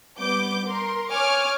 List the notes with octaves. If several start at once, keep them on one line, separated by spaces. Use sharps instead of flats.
G3 B3 D6 G6
A#4 C6
C#5 G#5 C#6 D6 F6